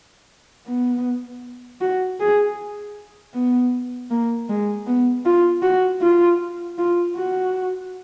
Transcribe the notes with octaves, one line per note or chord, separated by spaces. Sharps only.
B3
F#4
G#4
B3
A#3
G#3
B3
F4
F#4
F4
F4
F#4